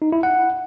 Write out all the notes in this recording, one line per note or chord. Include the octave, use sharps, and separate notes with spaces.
D#4
E4
F#5